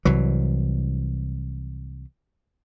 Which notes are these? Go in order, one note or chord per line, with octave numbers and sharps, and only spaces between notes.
C2 E3 F#3